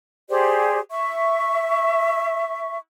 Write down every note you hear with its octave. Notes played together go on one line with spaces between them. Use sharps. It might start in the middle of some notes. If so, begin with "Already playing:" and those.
G4 G#4 C5 D5
E5 C#6